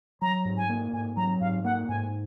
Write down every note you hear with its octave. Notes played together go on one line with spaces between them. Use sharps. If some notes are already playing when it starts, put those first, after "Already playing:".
F#3 A#5
G#2
G#5
A#3
G#2 G#5
F#3 A#5
G#2 F5
A#3 F#5
G#2 G#5